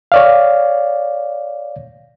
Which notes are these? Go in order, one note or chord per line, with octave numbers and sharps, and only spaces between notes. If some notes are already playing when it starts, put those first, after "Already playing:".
C#5 D5 F5